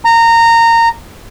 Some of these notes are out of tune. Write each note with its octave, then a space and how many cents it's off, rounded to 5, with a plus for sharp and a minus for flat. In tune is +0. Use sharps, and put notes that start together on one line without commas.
A#5 -20